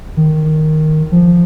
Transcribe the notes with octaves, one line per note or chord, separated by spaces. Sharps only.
D#3
F3